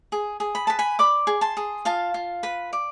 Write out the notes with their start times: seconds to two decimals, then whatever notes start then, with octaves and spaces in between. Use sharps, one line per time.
0.12 G#4
0.40 G#4
0.55 B5
0.67 B4 A5
0.79 G#5 B5
0.99 D5 B5 D6
1.27 G#4
1.41 A5 C6
1.57 G#4
1.85 F4 F5 A5
2.14 F4
2.43 B4
2.73 D5